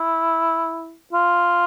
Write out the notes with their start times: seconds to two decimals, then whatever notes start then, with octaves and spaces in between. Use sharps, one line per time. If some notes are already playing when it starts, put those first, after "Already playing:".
Already playing: E4
1.13 F4